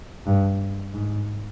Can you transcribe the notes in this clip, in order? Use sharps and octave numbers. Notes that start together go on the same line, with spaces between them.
G2
G#2